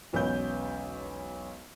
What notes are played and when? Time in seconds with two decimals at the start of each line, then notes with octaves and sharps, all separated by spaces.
0.13 E1 B1 B3 C#4 B4 G6